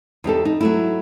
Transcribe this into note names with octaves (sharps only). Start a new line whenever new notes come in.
E2 D#4 G4 A4
D#4
F#3 A3 E4